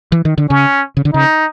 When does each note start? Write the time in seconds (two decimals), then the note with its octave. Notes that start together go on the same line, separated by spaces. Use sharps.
0.12 E3
0.25 D#3
0.38 D3
0.49 C#3 C#4
0.97 C#3
1.05 D3
1.13 C#3 D#4